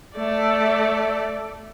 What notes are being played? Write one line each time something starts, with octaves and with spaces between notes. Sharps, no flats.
A3 D5